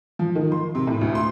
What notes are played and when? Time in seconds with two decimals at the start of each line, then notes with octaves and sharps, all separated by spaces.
0.19 F3
0.35 D#3
0.52 C6
0.75 C3
0.87 A2
1.01 D2
1.15 C6